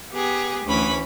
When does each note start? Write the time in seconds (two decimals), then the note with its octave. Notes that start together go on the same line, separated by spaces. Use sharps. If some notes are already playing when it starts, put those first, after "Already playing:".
0.13 B3 G4 G#4
0.66 D2 E3 C#4 B5